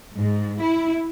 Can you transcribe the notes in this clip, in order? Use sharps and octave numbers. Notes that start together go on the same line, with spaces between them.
G#2
E4